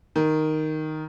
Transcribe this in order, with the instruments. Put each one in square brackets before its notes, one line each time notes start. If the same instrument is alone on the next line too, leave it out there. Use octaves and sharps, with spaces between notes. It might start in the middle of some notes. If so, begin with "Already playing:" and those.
[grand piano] D#3